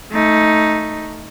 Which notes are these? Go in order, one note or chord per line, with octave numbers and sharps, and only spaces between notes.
A3 D#4